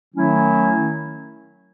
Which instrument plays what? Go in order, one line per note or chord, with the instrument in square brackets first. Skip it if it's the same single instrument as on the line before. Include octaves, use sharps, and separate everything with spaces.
[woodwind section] D#3 F#3 A3 C#4 E4